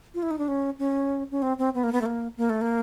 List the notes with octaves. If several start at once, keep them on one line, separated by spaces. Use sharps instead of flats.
F4
E4
D#4
D4
C#4
C#4
C#4
C4
C4
B3
A#3
B3
A3
A#3
A#3
A3
A#3